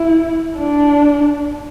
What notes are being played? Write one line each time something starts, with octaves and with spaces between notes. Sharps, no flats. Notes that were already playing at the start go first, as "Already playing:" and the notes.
Already playing: E4
D4